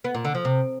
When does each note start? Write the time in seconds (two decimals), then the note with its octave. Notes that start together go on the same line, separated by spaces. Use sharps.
0.04 B3
0.14 A#2
0.25 D3
0.35 F3
0.45 C3